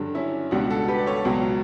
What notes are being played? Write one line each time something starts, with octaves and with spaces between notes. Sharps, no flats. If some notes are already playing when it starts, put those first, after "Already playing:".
Already playing: G2 D3 F#3 D4
C#4 E4
C#2 B2 G3 D4 F#4
F#4 A4
G4 B4
D5
A4 C#5
C#2 B2 F#3